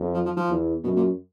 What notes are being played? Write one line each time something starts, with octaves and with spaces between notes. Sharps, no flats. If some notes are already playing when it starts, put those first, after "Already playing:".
Already playing: F2
F3
F3
F3
E2
F#2 B2
A#2